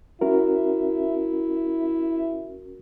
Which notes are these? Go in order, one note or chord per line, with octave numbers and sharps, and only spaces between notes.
C#4 E4 F#4 A#4